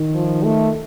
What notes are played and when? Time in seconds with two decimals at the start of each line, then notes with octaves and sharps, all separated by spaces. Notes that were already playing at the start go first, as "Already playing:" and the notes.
Already playing: D#3
0.14 F3
0.43 A3